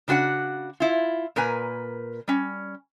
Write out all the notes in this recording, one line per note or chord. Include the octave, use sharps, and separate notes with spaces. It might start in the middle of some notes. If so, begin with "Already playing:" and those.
C#3 D4 F#4 C5 F#5
E4 F4
A#2 A#4 B4 G#5
G3 C#4